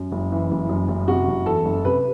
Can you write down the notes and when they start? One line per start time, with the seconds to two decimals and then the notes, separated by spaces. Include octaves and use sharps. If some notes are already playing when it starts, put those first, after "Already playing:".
Already playing: F#2
0.12 F#1
0.32 E3
0.51 F#1
0.69 F#2
0.88 F#1
1.08 C3 F#4
1.28 F#1
1.46 E2 A4
1.65 F#1
1.84 C3 B4